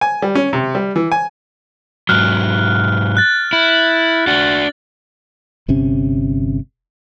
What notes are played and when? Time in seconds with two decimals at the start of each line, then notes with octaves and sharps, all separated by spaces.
0.01 G#5
0.22 G3
0.35 C#4
0.53 C3
0.75 G3
0.96 E3
1.12 G#5
2.09 G#2 F#3 F6 F#6
3.17 F#6 A6
3.53 E4
4.27 D4 F#4 A6 F#7
5.68 G1 C3 C#4